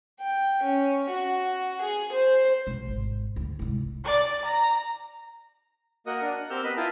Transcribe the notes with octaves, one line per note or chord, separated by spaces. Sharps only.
G5
C#4
F#4
G#4
C5
B1
G#1
D2
C2 G#2
D5
A#5
A#3 F#4 A#4 D#5 F#5 D#6
D4 A#4
F#5
C4 G4 A#4 E6 F6 G6
B3 D#5 B5
E4 F4 A#4 D#5 G5 A5